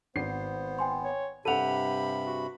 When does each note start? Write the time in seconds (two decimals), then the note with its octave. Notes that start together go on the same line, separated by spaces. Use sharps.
0.16 G#1 B3 C5 C7
0.79 G5 G#5 C6
1.03 C#5
1.45 G2 C3 G4 A4 F#5 B5 D#7 F7
2.26 F#4